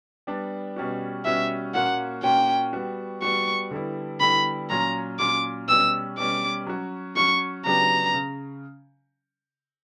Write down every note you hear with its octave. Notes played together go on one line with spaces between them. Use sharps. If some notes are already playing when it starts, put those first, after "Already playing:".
G3 B3 D4
B2 G3 C#4 F#4
B2 G3 C#4 F#4 E5
A#2 A#3 C#4 F#4 F#5
A#2 A#3 C#4 F#4 G5
G3 B3 F#4
G3 B3 F#4 C#6
D3 G3 B3 E4
D3 G3 B3 E4 B5
A#2 F#3 C#4 A#5
A#2 F#3 C#4 D6
B2 G3 C#4 E6
B2 G3 C#4 D6
F#3 C#4 F#4
F#3 C#4 F#4 C#6
C#3 F#3 B3 D4 G4 A#5
C#3